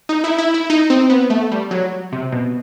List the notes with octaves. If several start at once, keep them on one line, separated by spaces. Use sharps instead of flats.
D#4
E4
E4
E4
D#4
C4
B3
A3
G3
F#3
C3
B2